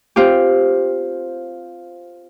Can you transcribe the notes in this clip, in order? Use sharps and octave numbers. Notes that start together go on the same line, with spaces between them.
C4 F4 G4